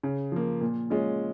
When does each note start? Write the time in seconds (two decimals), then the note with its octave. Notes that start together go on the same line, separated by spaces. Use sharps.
0.03 C#3
0.32 F3 A#3
0.61 A#2
0.90 G#3 C#4 F4